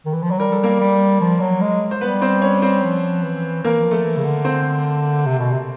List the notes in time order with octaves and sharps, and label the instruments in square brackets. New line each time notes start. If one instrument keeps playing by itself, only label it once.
[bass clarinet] D#3
E3
F3
F#3
[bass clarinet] G3 [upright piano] A#4
[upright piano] A4
A#3 A#4
[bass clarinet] G3
F3
F#3
G#3
[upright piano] C5
[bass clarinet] G3 [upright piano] B3 B4
[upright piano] C4 C5
C#4 C#5
C4 C5
[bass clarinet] F3
E3
[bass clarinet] E3 [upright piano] A#3 A#4
[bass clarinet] E3
F3
[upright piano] A3 A4
[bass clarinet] E3
C#3
D3
[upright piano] C4 C5
[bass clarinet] C3
B2
C3